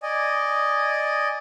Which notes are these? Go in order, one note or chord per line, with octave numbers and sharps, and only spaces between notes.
D5 D#5 G#5